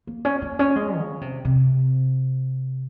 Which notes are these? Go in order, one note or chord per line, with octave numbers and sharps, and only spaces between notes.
A#3
C#4
A#3
C#4
G#3
C#3
C3
C3